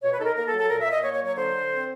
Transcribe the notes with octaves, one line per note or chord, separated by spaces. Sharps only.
B2 C#5
B4
D#4 A4
A#4
A#3 A#4
A4
F#3
A4
A#2 A#4
E5
A#2
D#5
A#3 C#5
C#5
F#3
C#5
D3 C5
D3
C4